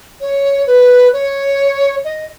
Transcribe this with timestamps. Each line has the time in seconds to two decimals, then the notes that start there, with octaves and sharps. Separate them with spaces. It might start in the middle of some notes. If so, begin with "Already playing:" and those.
0.21 C#5
0.67 B4
1.13 C#5
2.05 D#5